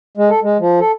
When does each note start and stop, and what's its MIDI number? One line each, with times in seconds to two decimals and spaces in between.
0.17 0.29 56
0.30 0.40 69
0.43 0.57 56
0.59 0.80 53
0.80 0.92 69